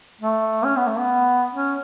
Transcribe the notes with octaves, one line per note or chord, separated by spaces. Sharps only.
A3
C#4
B3
A3
B3
C#4